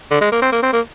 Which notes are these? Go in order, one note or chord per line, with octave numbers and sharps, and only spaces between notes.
D3
G#3
A#3
C4
A#3
C4
A#3